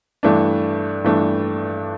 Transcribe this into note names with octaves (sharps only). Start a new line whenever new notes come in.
G2 E3 A3 D4
G2 E3 A3 D4